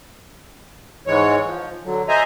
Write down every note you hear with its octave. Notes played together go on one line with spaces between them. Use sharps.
G#2 E3 G#3 C#5
F3
D3 F#3
C5 D#5 E5 G#5 A#5